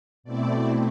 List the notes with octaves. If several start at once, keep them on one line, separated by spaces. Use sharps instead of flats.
B2 A3 C4 E4 D5